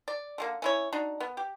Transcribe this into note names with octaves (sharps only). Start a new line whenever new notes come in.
D5
D3 G#3 A#3
C#4 E4 C#5
D4 D#4 F#4
B3
G4